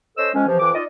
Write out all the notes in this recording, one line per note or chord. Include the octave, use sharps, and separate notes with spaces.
C#4 A4 C5 D#5 E6
F2 G#3 C#4
C3 E3 F3
F2 E3 D6
D#4 F4 D5 D#5